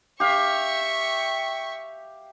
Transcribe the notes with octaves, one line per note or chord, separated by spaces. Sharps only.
G4 E5 F5 C#6